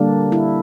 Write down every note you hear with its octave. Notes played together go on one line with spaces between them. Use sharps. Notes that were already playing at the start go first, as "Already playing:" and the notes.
Already playing: D3 G3 A#3 D4
E4